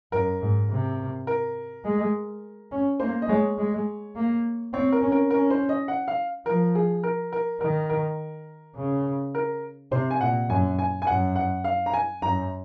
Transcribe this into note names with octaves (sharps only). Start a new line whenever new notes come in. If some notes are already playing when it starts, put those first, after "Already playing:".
F#2 A#4
G#2
C3
A#4
G#3
C#4
A#3 C5
D#5
G#3 C#5
G#3
A#3
C4 C#5
A#4
C#4
A#4
C#4 A#4
C5
D#5
F#5
F5
F3 A#4
G#4
A#4
A#4
D#3 A#4
A#4
C#3
A#4
C3 C5
G#5
A#2 F#5
F#2 G#5
G#5
G#5
F#2 F#5
F#5
F5
A#5
G#5
F#2 A#5